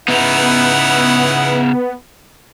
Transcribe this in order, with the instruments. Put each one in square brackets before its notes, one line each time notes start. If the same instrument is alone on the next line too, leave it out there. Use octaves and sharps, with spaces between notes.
[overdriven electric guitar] C#3 D#4 [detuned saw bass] B3 [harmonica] E4 F#5